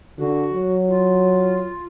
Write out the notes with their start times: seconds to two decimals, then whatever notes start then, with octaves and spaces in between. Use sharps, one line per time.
0.18 D3 F#4
0.53 F#3
0.88 F4